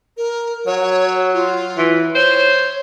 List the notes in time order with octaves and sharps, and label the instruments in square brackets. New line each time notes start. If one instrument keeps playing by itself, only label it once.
[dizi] A#4
[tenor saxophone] F#3 [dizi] C#5
[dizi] F4
[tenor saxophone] E3
[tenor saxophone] C5 [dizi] C#5